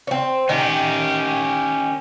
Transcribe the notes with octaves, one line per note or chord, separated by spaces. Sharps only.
C4 C#4
D#3 C#4 G4